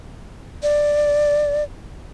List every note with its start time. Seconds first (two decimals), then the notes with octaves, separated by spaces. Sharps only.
0.63 D5